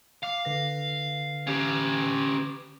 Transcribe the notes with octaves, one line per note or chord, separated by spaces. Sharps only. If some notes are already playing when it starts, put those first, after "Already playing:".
F5 D6 C7
D3 B4 A#6
C#4 G4